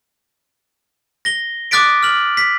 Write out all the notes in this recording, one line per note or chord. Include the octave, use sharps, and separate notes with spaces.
A#6 G7
D6 D#6 F#6 A6 B6 D7
F6 F#7
B6